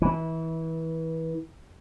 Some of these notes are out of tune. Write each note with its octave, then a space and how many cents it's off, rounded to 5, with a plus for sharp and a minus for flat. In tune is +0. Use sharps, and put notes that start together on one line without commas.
E3 -25